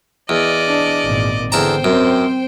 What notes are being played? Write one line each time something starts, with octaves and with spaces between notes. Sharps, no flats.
E2 D5 D#5
D4
G#1 A#2
E2 D3 C5 G5 A5 A#5
F#2 C4